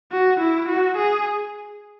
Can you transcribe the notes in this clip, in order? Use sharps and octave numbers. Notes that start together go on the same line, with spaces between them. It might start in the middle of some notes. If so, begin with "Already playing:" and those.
F#4
E4
F#4
G#4